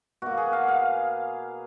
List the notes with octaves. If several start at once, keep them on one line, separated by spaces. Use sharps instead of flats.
B2 A#3 F#4
G#4
F5
F5